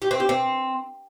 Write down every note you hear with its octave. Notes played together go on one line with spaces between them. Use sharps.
G4
C4
G4
C4